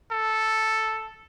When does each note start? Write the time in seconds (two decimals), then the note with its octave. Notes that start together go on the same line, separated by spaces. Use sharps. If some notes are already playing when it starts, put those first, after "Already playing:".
0.12 A4